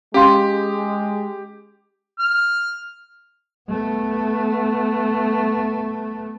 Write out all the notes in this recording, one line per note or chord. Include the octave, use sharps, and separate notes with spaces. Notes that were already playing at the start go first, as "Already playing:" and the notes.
G#3 C#4 G4 F5 C6
F6
A3 B3